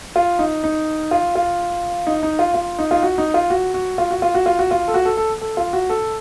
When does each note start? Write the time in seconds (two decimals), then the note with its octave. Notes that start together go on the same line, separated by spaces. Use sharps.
0.16 F4
0.39 D#4
0.64 D#4
1.11 F4
1.35 F4
2.07 D#4
2.23 D#4
2.39 F4
2.54 F4
2.79 D#4
2.91 F4
3.03 F#4
3.18 D#4
3.34 F4
3.50 F#4
3.74 F#4
3.98 F4
4.11 F#4
4.22 F4
4.35 F#4
4.46 F4
4.59 F#4
4.71 F4
4.88 A4
4.94 F#4
5.05 A4
5.17 A4
5.41 A4
5.57 F4
5.73 F#4
5.90 A4